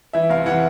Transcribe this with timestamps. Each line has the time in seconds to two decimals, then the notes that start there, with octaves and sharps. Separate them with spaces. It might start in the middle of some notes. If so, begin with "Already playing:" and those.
0.13 E3 E5
0.30 F1 F5
0.46 E3 F#5